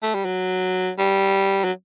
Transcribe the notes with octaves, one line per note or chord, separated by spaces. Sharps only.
A3
G3
F#3
G3
F#3